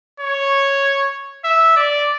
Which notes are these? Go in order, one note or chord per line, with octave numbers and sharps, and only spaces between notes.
C#5
E5
D5